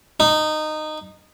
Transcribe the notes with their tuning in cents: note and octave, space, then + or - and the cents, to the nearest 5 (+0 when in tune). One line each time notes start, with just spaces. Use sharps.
D#4 -15